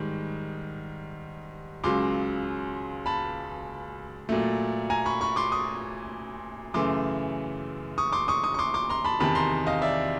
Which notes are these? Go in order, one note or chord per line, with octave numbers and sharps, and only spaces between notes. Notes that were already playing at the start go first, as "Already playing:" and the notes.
Already playing: G#2 D#3 G3
C#2 C#3 F#3 C6 D6
A5 B5
A#2 F#3 A3
G#5 A#5
B5 C#6
B5 C#6
C6 D6
C#6 D#6
F#2 C#3 E3 A3 C6 D6
C#6 D#6
C6 D6
C#6 D#6
C#6 D#6
C#6
C6 D6
C6 D6
A#5 C6
A5 B5
E2 C3 D#3 A5 B5
A#5 C6
D#5 F5
D5 E5